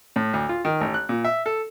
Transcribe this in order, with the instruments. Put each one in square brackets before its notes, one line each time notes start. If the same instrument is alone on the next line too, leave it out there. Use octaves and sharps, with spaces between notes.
[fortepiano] A2
D2
F4
D#3
A1
F#6
A#2
E5
A4